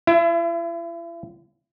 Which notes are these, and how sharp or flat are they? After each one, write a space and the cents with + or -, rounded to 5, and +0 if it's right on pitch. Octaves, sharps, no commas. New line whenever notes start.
E4 +40 E5 +15